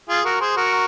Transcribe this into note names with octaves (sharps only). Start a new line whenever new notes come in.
F4 G#4
F#4 A#4
G#4 C5
F#4 A#4